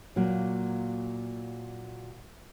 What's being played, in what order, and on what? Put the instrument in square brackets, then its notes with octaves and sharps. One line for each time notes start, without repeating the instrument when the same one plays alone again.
[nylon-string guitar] A#2 F#3 A#3